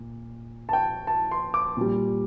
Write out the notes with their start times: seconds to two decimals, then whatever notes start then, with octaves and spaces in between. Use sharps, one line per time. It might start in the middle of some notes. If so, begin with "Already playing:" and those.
Already playing: A#2
0.69 A5
0.73 G5
1.07 A5
1.31 C6
1.54 D6
1.77 A#2 G3